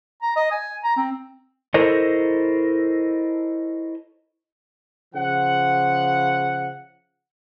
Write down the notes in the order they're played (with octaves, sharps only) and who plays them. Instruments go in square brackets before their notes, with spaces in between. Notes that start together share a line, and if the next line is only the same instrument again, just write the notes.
[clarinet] A#5
D#5
G#5
A#5
C4
[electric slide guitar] E4 A4 A#4 C5 C#5 D#5
[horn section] C#3 F3 F#5